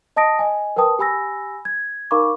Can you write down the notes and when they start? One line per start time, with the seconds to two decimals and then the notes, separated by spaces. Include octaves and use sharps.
0.16 D#5 A5 D#6 A#6 D7
0.39 D#5 G#5
0.76 A#4 B4 G5 A5 D#6
0.99 G4 G#5 B5 E6 A#6
1.65 G#6
2.11 D#4 A#4 F5 B5 C#6 D6